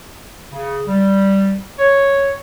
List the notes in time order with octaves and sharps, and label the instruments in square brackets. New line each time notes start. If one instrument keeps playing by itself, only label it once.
[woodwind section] C#3
G3
C#5